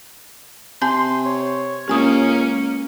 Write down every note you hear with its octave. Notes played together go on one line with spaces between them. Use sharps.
C3 G#5 A5 C6 G6
C#5
C#2 A#3 C#4 G4 G#5 D#6